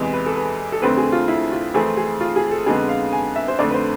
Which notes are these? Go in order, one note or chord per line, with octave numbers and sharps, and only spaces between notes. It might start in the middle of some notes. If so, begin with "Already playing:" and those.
Already playing: E2 C3 E3 G#3
B4
A4
B4
A4
F2 D3 A3 C4 B4
G#4
F4
E4
F4
F2 E3 A3 C4 G#4
G#4
F4
G#4
A4
F2 D3 G#3 B3 G#4
F5
G#5
E5
C5
F2 D3 A3 D5
B4
C5